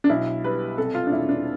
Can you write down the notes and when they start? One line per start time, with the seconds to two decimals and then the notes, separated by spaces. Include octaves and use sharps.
0.04 D4
0.10 B1 E4
0.44 G3 B4
0.78 C3 A4
0.95 F4
1.07 D4
1.11 E1 E4
1.29 D4